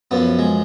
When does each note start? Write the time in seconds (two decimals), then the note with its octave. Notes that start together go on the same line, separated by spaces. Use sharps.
0.11 F#2 F3 B3
0.39 G#3